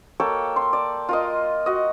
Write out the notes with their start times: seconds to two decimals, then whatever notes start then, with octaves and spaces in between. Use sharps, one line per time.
0.20 A#3 A4 C#5 G5
0.56 C6
0.73 D5
1.09 F4 A#4 D#5
1.66 F#4 D#5